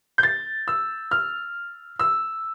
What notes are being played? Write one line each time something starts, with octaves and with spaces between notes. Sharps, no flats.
G6
A6
E6
F6
E6